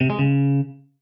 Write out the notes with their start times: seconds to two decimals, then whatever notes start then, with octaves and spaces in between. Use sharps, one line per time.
0.01 C3
0.10 G#3
0.19 C#3